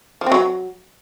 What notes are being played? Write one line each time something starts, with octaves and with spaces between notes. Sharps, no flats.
F3
C4
F#3